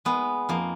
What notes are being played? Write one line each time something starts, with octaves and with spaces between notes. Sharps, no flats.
G#3 B3
F2 A#3